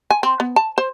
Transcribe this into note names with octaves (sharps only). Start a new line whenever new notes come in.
G#5
C4
B3
A5
C5